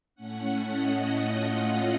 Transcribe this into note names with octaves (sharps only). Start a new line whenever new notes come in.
A2 A3 C#4 F#5
D#5
F4